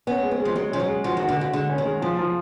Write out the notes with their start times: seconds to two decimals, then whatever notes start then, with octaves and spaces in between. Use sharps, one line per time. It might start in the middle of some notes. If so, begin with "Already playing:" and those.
0.07 B3 C#4
0.23 G#3
0.31 C4
0.40 G#3
0.45 F3
0.56 F#3 G#3
0.72 F3 C#4
0.80 F#3
0.88 G#3
1.04 F3 F#4
1.17 D#3 F#4
1.29 D3
1.37 C#3 F#4
1.53 D3 G#3
1.70 C#4
1.78 D#3
1.85 G#3
2.02 C#3 F3
2.19 F3